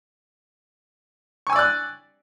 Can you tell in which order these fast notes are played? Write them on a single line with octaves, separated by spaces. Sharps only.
C#6 G#5 E6 D5 F#6